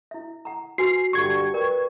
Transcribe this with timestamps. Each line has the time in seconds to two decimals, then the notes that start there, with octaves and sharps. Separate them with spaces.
0.11 E4 E5
0.45 F#5 A#5
0.78 F#4 B4 G#5 C7
1.13 G2 D3 G3 C#6 G#6
1.54 A#4 B4 D5 G5